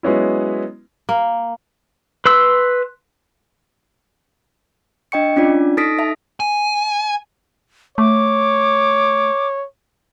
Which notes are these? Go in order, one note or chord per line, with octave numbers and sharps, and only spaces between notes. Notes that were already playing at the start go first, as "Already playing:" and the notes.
F#3 G#3 B3 C#4 E4
A#3
B4 C6 E6
D4 D#5 G5 C#6 C#7
C#4 D4 F4 D5
D#4 A4 D#6 A#6 B6 D7
A4 E5 A5
G#5
A3 C#5 D6